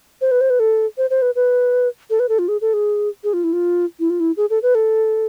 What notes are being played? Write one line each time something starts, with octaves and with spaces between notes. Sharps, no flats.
C5
B4
C5
B4
A4
C5
C5
B4
B4
A4
B4
A4
F4
G#4
A4
G#4
G#4
F4
E4
F4
E4
F4
E4
G#4
A4
B4
A4